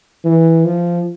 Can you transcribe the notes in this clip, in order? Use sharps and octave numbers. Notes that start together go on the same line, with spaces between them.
E3
F3